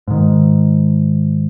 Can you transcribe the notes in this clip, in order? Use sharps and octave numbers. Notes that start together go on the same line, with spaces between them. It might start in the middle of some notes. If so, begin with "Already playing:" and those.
G#2 D#3